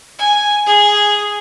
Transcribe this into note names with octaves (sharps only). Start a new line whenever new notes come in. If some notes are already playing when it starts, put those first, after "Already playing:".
G#5
G#4